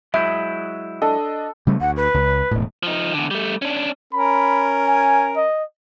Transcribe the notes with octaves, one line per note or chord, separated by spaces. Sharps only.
F#3 G#3 E4 E5 D#6 G6
D4 A4 D#5
C#3 G3 A3
D2 F#5
B4
C#2
E1 A2
F3 D#4
E2 D3
G3 A3
C#4 D4
C#4 A#4 B5
G#5
D#5